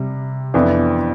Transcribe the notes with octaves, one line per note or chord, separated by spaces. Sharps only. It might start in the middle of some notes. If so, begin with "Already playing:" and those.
Already playing: C3 G3
F2 E3 B3 D4